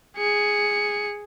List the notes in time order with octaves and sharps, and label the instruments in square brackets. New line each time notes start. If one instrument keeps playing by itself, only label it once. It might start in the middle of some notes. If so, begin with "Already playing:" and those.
[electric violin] G#4 C#7